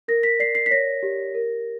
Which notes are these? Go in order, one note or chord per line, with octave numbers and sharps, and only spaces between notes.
A#4 A#6
B6
D5 C7
C7
B6
C#5 A#6
G4
A#4